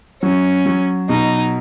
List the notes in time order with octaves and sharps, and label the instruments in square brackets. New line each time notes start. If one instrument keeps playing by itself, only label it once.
[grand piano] F#3 [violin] C#4
[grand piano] F#3
[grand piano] B2 [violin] D#4